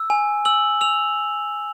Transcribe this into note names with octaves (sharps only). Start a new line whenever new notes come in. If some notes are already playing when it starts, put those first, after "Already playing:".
Already playing: E6
G#5
E6 F#7
E6 F7